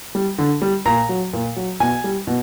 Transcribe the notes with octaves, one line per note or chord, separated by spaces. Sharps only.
G3
D3
G3
A#2 A#5
F#3
A#2
F#3
B2 G#5
G3
B2